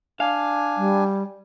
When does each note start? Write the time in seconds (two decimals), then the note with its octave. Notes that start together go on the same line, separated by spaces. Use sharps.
0.20 D4 F5 G#5
0.77 G3